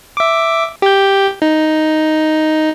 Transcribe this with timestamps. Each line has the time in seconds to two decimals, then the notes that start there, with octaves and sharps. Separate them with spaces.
0.17 E5 D6
0.82 G4 G6
1.42 D#4